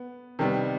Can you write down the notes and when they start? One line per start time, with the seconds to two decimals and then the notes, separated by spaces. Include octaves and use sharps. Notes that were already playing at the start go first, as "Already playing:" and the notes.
Already playing: B3
0.39 C3 D#3 G3 B3